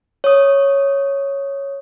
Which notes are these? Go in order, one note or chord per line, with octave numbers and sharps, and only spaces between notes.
C#5 D#6